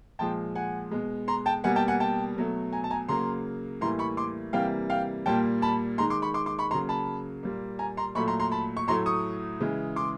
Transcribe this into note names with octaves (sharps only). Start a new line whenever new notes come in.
A#2 F3 G#3 G5 A5
F#5 G#5
B2 G#3
A#5 C6
G5 A5
B2 G3 A#3 F#5 G#5
G5 A5
F#5 G#5
G5 A5
B2 F#3 A3
G#5 A#5
A5
G#5 A#5
C#3 F#3 A#3 A#5 C6
A2 E3 G3 A#3 A#5 C6
B5 C#6
C6 D6
C3 E3 G3 A#3 F5 G5
F5 G5
A#2 G3 A#3 G5 A5
A5 B5
D#3 G#3 A#5 C6
C6 D6
B5 C#6
C6 D6
C6 D6
B5 C#6
C#3 F#3 A#3 A#5 C6
A5 B5
A#2 G3 A#3
G#5 A#5
A#5 C6
A#2 F#3 A3 B5 C#6
A#5 C6
A#5 C6
A5 B5
C#6
A2 F#3 A3 A#5 C6
C#6 D#6
C#3 E3 G#3
C6 D6